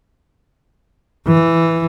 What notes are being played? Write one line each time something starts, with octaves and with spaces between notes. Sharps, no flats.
E3